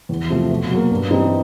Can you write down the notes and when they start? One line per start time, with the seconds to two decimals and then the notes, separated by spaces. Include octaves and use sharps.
0.09 E2
0.29 C3 F3 A3
0.50 B2
0.71 F#3 A#3
0.91 G2
1.11 E3 G3 C4 D#4